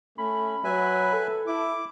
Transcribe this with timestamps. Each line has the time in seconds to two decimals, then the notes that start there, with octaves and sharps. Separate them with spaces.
0.18 A3 C#4 B5
0.64 F#3 B4 E5 G#5
1.13 A4
1.47 E4 D6